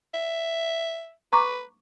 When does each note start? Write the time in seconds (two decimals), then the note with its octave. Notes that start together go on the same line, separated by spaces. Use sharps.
0.14 E5
1.33 B4 A#5 C#6 D6